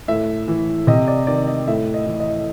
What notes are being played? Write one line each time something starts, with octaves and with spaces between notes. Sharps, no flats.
A2 E5
E3
C3 D#5
D5
D#3 D5
D#5
A2 E5
D#5
E3
D#5